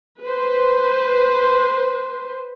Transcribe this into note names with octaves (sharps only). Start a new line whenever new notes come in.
B4 C5